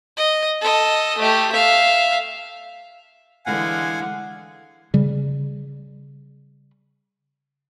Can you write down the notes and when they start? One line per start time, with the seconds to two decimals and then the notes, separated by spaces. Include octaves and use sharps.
0.17 D#5
0.62 A4 D#5
1.19 A3 G4
1.52 E5 F5
3.46 D3 E3 G#3 F5 F#5 G#5
4.94 C#3 G3